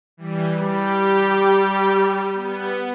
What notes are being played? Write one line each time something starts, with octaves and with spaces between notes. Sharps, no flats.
E3 G3
G3 G4
B3